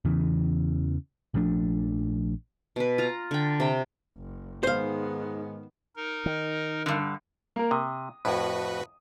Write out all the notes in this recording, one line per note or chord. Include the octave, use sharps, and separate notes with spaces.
E2 C#3 E3
A#1 F3 A3 D4
B2 B4
F4 A#5
D3 G5
C3 G5
F#1
G#2 D#3 G#3 B3 C5 F5
D#4 A#4
D#3
G2 D3
A#3 A#4
C3 D#6
F2 A2 F#4 B4